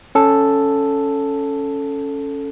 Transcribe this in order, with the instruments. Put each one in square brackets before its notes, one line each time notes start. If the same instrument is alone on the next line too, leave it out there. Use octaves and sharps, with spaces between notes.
[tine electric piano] C#4 A4